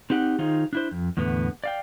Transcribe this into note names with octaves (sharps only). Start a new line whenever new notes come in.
C4 D#4 G4 F#5
D#3 D#4 F4 G#4 C5
D4 E4 C5
F2
E2 A2 D3 B3
D5 F5 G5